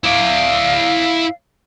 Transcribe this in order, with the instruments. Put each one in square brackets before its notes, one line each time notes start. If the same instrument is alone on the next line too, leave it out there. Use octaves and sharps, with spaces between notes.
[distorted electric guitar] E4 D5 [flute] F5